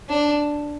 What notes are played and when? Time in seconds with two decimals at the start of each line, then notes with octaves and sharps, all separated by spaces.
0.09 D4